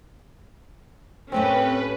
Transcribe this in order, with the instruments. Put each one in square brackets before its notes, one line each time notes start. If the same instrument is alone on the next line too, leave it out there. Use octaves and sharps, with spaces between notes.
[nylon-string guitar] A2 A3 A#3 [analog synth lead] C4 [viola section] C#4 G4 [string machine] B4